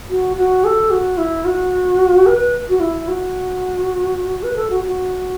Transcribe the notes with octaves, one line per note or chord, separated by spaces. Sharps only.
F#4
F#4
A4
F#4
E4
F#4
B4
F#4
E4
F#4
B4
A4
F#4
F#4